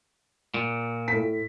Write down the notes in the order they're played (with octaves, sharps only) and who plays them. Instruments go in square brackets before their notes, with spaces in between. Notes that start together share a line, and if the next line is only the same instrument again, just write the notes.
[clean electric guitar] A#2
[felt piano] A2 B6